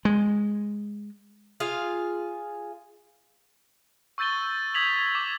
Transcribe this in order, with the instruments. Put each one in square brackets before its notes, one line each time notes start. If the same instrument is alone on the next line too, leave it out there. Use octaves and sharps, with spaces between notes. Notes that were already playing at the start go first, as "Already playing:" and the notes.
[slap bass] G#3
[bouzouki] F4 G#4 F5
[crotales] C#6 E6 G6 A6 D#7 G7
D#6 G#6 B6 F7 F#7
D6